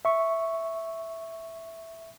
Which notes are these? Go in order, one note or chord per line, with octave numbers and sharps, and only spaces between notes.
E5 C#6